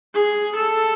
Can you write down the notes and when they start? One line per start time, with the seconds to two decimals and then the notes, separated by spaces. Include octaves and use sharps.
0.15 G#4
0.56 A4